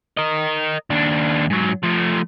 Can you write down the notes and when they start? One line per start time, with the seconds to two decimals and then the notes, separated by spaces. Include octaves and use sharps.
0.17 A#4 D#5
0.90 D#2 D4
1.50 G#2 F#3
1.83 F3 A3